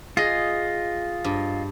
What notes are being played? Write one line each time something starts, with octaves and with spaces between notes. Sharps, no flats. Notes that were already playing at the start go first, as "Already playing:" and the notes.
F4 G#4 D#5
G2